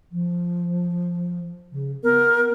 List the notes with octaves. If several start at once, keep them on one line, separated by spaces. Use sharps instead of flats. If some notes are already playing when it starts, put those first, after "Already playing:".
F3
C#3
B3 A#4